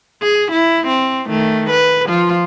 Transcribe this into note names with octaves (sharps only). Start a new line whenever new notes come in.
G#4
E4
C4
D#3 A3
B4
F3 F4